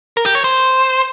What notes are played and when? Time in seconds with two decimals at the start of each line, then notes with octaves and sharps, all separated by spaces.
0.17 A#4
0.26 G4
0.35 C#5
0.44 C5